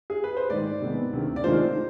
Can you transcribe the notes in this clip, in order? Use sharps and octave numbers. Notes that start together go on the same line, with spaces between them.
G#4
B4
C5
G#2 D#3 G#3 D5
C3 D#3 G#3 B3
D2 C3 D#3
D5
C3 D#3 G#3 D4 F4 C5